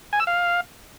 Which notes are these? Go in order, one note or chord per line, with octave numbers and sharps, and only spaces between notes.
G#5
E6
F5